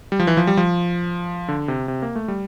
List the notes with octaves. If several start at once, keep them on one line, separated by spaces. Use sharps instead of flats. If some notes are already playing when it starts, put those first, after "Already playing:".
G3
F3
E3
F3
G3
F3
D3
C3
C3
A#3
A3
G3